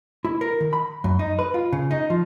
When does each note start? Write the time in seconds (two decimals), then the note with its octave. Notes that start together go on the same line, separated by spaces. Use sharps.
0.25 E4
0.41 A#4
0.60 D#3
0.73 B5
1.04 F#2
1.19 D#4
1.39 B4
1.54 F4
1.73 C#3
1.91 D#4
2.10 F3